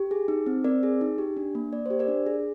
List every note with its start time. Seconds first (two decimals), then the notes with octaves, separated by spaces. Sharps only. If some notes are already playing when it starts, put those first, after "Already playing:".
Already playing: G4
0.11 G#4
0.28 D#4
0.46 C4
0.64 C4 A#4 D5
0.83 G#4
1.01 D#4
1.18 G4
1.37 D4
1.55 A#3
1.73 A#3 D5
1.86 G4 C5
1.99 A#4 D5
2.08 D4
2.26 G#4